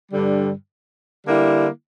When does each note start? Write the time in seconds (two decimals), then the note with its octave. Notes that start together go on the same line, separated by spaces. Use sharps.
0.10 G2 D3 G3
1.26 D3 G3 A#3 E4